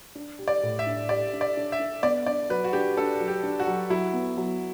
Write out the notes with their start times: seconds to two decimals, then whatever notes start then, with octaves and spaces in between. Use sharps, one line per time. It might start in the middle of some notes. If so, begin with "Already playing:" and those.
0.15 D4
0.39 G4
0.48 D5
0.63 A2
0.79 E5
0.86 D4
1.09 G4 D5
1.33 D4
1.41 D5
1.57 D4
1.72 E5
1.80 D4
2.03 B3 D5
2.26 D4 D5
2.50 F#3 B4
2.64 F#4
2.73 D4 G4
2.97 D4 A4
3.20 F#3
3.28 G4
3.43 D4
3.60 F#4
3.67 F#3
3.90 F#3 E4
4.13 B3
4.37 F#3